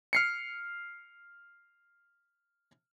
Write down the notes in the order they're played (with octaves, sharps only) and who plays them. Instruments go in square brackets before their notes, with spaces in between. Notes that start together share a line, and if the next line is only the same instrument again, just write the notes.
[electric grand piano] F6 C7 C#7